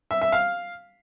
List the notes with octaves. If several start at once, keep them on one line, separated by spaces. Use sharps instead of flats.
E5
E5
F5